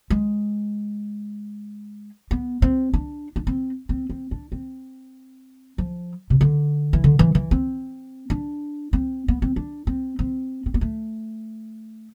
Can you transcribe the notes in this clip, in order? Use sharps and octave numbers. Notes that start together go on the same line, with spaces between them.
G#3
B3
C4
D4
D4
C4
C4
C4
D4
C4
F3
C3
D3
E3
D3
E3
E3
C4
D4
C4
B3
C4
D4
C4
C4
C4
B3
A3